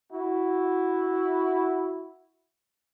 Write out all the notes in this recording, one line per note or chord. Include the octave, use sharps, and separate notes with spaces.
E4 F#4